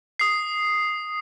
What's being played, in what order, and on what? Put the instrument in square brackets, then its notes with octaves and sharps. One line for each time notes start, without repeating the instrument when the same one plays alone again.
[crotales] D#6 C7